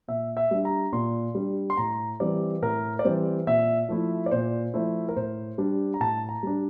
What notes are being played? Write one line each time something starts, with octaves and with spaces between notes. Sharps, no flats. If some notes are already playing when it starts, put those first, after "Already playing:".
A#2 E5
E5
G3 D4
A#5
A#2 C6
G3 D4
C6
A2 A#5
E3 G3 C4 D5
A2 A#4
D5
E3 G3 C4 C5
A#2 E5
F3 A3 E4
D5
A#2 C5
F3 A3 E4 C5
A#4
A2 C5
G3 D4
A#5
A2 A5
A#5
G3 D4